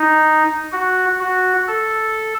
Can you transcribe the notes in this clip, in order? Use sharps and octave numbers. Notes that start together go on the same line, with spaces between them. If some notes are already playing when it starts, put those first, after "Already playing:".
Already playing: D#4
F#4
F#4
A4